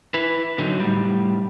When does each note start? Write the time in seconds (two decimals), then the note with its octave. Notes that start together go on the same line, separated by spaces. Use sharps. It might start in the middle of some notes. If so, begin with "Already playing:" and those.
0.14 E4 B4
0.58 D3 F#3 D#4
0.80 A2 G3